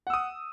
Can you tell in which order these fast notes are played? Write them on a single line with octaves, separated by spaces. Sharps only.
F#5 E6 D#6